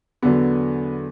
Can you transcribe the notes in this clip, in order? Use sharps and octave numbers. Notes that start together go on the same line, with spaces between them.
E2 D3 F#3 B3